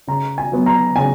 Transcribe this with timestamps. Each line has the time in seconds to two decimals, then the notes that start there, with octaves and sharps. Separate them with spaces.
0.07 C#3 A#5
0.38 G#5
0.52 F#3 B3
0.66 A#5
0.96 C#3 G#5